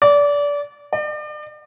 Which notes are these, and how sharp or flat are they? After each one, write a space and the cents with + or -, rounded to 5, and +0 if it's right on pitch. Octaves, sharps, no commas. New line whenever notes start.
D5 -25
D5 +40